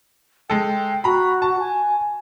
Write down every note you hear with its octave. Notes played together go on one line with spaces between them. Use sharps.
G#3 A4 G5
F#4 A#5 B5
A5
G#5